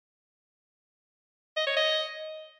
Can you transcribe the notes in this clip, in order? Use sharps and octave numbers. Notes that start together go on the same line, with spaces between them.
D#5
C#5
D#5